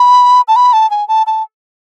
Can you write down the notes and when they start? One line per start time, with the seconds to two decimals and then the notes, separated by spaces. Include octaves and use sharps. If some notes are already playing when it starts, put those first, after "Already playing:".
Already playing: B5
0.48 A5
0.56 B5
0.73 A5
0.90 G#5
1.08 A5
1.27 A5